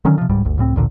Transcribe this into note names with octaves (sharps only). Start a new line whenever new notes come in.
D3 D#3 F#3 C#4
C3 F3
D1 C#2 G#2 G3
G1 D2
C#2 A2 F3 C4
A1 D2 A#2 D3